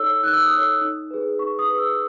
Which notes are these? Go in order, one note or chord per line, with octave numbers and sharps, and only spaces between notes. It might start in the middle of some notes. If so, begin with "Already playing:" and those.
Already playing: D#4 A4 C#5 E6
D#4 F#6
E6
D#6
A4 C#5 E6
D#4
G#4 B4
D#4 C#6
D#6
G#4 B4
E6